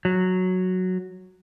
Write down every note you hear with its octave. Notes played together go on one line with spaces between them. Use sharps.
F#3